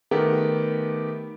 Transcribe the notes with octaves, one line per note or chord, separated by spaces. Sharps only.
D#3 A3 B3 G4 A#4